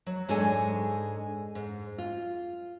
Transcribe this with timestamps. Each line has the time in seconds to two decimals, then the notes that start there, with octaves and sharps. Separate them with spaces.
0.06 F#3
0.28 G#2 G#3 D4 A4 C#5 G#5
1.55 G#2
1.98 F4